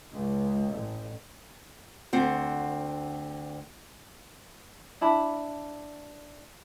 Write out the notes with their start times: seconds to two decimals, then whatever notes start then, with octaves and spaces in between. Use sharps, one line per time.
0.11 C#2
0.72 A1
2.13 D2 C4 F#5
5.01 D4 E4 A5 B5